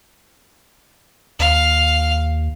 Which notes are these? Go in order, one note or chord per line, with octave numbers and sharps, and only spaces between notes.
D#2 F5